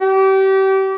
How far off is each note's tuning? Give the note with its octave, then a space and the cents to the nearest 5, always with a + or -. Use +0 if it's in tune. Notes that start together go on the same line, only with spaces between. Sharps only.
G4 -30